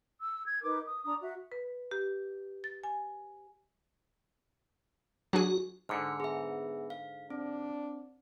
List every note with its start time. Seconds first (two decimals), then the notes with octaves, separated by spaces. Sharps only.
0.22 E6
0.48 G#6
0.63 D#4 A#4 B4 D6
0.86 D#6
1.04 D4 A#5 D#6
1.21 F#4 E5
1.52 B4
1.91 G4
2.64 A6
2.84 G#5
5.33 F#3 D4 F#4 G#4
5.89 G#2 D3 F6 C#7
6.20 B3 G#4 E5
6.90 F5
7.30 C4 D4